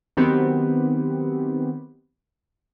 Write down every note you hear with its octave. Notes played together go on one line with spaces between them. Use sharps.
D#3 F#3 B3 C4 G4